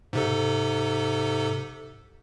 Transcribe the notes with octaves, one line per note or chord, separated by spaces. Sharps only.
G#2 C3 A4